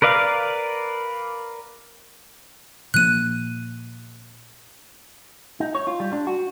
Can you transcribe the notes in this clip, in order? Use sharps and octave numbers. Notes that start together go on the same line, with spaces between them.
A#4 B4 D5 F5
A#2 F3 A#3 F#6 D#7
D#4
C#5
F4
G3
D4
F#4